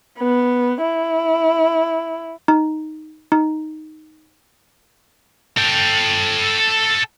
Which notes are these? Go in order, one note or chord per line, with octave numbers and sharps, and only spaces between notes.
B3
E4
D#4
D#4
A4 G5